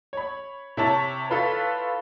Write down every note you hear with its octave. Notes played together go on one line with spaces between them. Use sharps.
C#5 B5
C3 E4 C#5 A5
F4 A4 B4